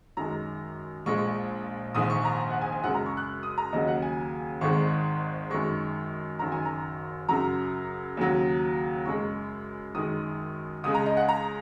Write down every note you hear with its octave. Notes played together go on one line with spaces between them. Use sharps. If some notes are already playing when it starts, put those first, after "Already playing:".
F#2 D#3 G#3 A#5
A#1 A#2 G#3 C#6
A#1 G#2 D#3 D#6
C#6
A#5
F#5
G#5
G#5
F#2 C#3 G#3 F#5
A#5
C#6
F#6
D#6
A#5
D#2 C#3 F#3 D#5
F#5
G#5
G#1 G#2 D#3 G#3 C#6
F#2 D#3 G#3 C#6
F#1 F#2 D#3 A#5
G#5
A#5
F#2 C#3 F#3 A#5
D#2 C#3 F#3
F#2 C#3 G#3 C#6
F#2 D#3 G#3 D#6
C#2 C#3 G#3 D#6
A#5
D#5
F#5
A#5